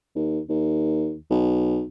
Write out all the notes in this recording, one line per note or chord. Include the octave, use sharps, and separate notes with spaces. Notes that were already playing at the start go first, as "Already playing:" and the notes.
D#2
D#2
B1